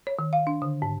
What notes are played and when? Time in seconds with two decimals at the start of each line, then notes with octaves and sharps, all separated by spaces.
0.07 C#5
0.19 D#3
0.33 F5
0.47 D4
0.62 D3
0.82 G#2